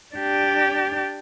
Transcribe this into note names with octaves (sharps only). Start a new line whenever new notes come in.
D4 G4